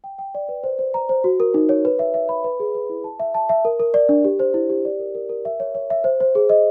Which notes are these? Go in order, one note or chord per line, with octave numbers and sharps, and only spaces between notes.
G5
G5
D5
B4
C5
C5
A#5
C5
F#4
A#4
D#4
C#5
B4
E5
E5
B5
B4
G#4
B4
E4
A5
E5
A5
E5
A#4
A#4
D5
D4
G4
C5
E4
G4
D5
A#4
A#4
A#4
E5
C#5
C#5
E5
C5
C5
G#4
D#5